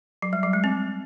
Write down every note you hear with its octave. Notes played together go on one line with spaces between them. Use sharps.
F#3
G3
F#3
G#3
C4